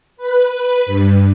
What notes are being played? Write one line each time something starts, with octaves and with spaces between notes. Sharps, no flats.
B4
G2